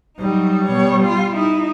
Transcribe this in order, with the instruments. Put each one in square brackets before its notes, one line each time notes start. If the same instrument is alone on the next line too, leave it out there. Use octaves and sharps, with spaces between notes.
[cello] F#3 D#4 [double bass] G3
[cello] B2 C#5
F4
D#4 E4